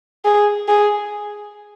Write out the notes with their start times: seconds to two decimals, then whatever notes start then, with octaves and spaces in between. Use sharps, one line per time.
0.25 G#4
0.68 G#4